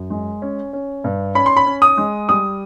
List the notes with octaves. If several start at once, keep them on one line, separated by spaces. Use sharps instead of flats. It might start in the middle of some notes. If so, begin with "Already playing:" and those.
Already playing: F#2
G#3
C#4
C#4
G2
C#4 B5
C6
B5
C#4
D#6
G#3
G3 D#6